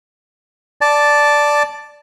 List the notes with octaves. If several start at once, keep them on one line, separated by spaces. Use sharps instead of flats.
D5 A5